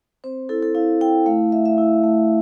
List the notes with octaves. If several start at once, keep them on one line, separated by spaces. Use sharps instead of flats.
C4 C5
E4 A4
A4
E4 F5
E4 G5
A3 F5
A3 E5
E5
E4
A3